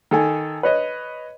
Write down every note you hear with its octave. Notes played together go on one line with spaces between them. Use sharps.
D#3 A4 G#5
B4 C#5 D#5